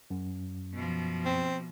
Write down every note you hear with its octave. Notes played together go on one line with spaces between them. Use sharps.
F#2
B2 F3
C4